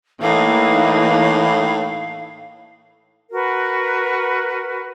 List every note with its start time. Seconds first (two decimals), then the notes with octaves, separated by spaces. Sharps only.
0.21 A2 E3 A#3 D#4 F5
3.32 F#4 A#4 B4